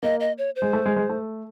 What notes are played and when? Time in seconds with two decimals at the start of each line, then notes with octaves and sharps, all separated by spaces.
0.03 A#3 D#5
0.20 D#5
0.38 C#5
0.56 C5
0.62 G#3
0.73 A3
0.86 G#3
0.96 G#3
1.09 A3